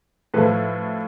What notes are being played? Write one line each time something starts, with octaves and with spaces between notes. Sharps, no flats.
A2 F3 A3 A4 B4